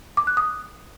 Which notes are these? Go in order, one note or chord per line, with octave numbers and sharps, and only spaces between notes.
D6
F#6
D#6